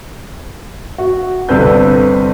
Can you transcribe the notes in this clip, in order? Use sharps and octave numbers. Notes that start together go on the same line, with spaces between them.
F#4
G1 C3 A4 B4 G6